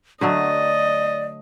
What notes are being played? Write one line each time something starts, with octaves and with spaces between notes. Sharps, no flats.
D3 F#3 A3 D5 D#5